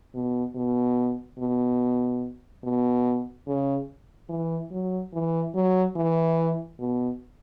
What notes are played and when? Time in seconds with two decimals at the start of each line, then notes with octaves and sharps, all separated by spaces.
0.15 B2
0.55 B2
1.39 B2
2.64 B2
3.47 C#3
4.29 E3
4.71 F#3
5.13 E3
5.55 F#3
5.96 E3
6.80 B2